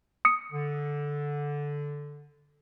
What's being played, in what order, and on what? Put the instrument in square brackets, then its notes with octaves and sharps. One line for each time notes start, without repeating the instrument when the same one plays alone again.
[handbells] D#6 C#7
[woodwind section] D3